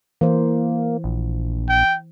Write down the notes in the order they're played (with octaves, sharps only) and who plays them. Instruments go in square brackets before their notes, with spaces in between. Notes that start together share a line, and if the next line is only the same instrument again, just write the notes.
[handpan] E3 C5 [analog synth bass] A#3
[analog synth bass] A#1
[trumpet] G5